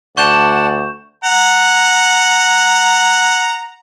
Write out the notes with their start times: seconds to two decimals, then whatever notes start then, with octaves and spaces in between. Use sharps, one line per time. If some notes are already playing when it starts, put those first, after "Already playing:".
0.17 D2 D5 F#5 A5 C#6 G6 E7
1.24 F#5 A#5